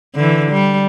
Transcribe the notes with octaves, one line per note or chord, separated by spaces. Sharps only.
D3 E3
G3